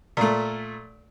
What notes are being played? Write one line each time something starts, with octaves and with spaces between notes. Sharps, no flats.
A#2 A3